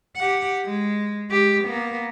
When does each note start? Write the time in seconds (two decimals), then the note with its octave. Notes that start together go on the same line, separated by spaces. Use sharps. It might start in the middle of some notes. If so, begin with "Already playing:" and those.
0.17 G4 F#5
0.65 G#3
1.30 G#3 G4
1.65 A#3 B3